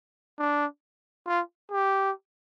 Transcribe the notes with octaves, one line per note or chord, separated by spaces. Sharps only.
D4
F4
G4